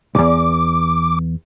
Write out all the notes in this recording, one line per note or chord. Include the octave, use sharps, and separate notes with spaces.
B1 E2 D6